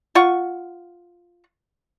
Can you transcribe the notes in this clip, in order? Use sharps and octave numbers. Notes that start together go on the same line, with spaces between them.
F4 F#5 C#6